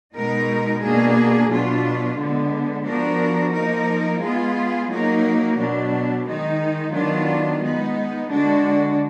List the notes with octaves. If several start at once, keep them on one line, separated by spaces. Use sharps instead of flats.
B2 G#3 D#4 A#4
B2 A#3 D4 G#4
B2 F#3 D4 F4
D3 G#3 B3
F3 B3 D4 F#4 A#4
F3 A#3 D#4 A#4
G#3 B3 F4 G#4
F#3 A#3 D#4 A#4
B2 F#3 D4
D#3 G#3 D#4
D#3 F#3 B3 D4 F4
G#3 B3 D#4
D3 G#3 D4 F#4